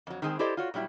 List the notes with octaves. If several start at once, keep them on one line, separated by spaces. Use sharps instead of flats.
F2 F#3
D#3 G#3 C4 G#4
E4 G4 A4 C5 D5 D#5
F4 F#4 C#5
A#2 F#3 G3 E4